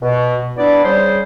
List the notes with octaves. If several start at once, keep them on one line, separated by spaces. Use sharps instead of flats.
B2
B3 D4 E4 D5
C#3 G3 G#4 C5